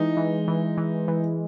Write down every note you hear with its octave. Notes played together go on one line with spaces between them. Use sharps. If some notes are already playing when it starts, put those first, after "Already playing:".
Already playing: E3 G#3 D#4
E3
E3
E3
E3